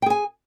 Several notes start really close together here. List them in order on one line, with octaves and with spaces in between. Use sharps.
G5 G#4 G#5